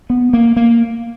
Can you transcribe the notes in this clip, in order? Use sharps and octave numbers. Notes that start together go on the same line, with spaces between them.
B3
A#3
A#3